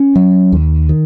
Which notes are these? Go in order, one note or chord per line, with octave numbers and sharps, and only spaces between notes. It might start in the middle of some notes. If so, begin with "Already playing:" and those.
Already playing: C#4
F#3
D#2
D#3